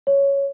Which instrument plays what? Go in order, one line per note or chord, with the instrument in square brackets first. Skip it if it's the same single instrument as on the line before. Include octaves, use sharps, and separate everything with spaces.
[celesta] C#5